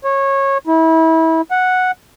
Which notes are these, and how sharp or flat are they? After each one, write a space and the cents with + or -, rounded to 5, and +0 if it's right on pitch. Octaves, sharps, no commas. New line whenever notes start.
C#5 -20
E4 -30
F#5 -5